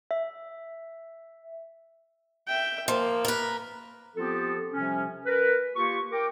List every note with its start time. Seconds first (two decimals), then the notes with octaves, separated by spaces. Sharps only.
0.11 E5
2.47 E5 G5
2.88 F3 A#3
3.25 A#4 B4
4.16 F3 B3 C4 F4 G4 A4
4.73 C3 F3 G3 C#4
5.26 A#4 B4
5.75 A#3 F4 G4 C#6
6.12 A#4 G5 D6